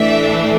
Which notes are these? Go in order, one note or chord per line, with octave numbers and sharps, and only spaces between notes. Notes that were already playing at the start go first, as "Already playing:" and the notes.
Already playing: A2 E3 A3 D4 E5